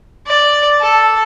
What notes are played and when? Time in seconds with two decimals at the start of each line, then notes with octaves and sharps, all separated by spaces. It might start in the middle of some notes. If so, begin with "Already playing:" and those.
0.27 D5
0.81 A4